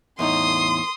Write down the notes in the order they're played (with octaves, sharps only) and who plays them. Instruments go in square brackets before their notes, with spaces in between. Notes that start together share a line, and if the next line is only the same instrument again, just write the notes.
[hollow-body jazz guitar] E2 A2 D#4 [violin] C6 D#6